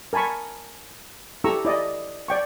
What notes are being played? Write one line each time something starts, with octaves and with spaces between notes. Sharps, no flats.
A#4 G#5 A5 B5 C#6
E4 G4 A4 A#5 C#6 E6
E4 D5 D#5
D5 G5 C#6